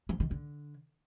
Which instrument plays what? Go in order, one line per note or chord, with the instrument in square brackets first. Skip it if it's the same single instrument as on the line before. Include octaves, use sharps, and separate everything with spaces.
[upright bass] F3
D#3
D3